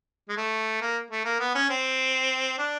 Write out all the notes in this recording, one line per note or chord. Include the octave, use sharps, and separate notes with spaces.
G#3
A3
A#3
A3
A#3
B3
C#4
C4
D4